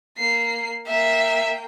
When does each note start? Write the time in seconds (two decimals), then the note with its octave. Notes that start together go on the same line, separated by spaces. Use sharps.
0.17 A#3 C7
0.87 A#3 E5 G5